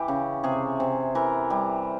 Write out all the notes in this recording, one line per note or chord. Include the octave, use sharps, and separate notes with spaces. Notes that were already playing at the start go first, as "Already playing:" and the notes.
Already playing: E3 G4
C#3
C3 G#4
C3
E3 A#4
G3